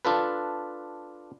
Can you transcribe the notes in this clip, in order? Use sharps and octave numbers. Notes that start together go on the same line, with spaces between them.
D4 F4 A4 B4